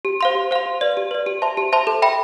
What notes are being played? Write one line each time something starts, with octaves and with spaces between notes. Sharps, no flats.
G4
C5 F5 C6
G4
C5 F5 C6
G4
B4 D5
G4
B4 D5
G4
C5 E5 A5 C6
G4
C5 E5 A5 C6
A4
E5 G5 B5